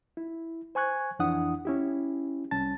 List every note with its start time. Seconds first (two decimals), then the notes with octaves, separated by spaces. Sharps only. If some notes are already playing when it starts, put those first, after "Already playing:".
0.17 E4
0.75 C5 G#5 C#6 F#6 G#6
1.19 F2 E3 D4 E4 F#5 D#6
1.65 C#4 E4 G4
2.51 C2 G3 C#4 A5 A6